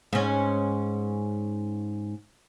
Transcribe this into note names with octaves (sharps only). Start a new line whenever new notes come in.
G#2 C#4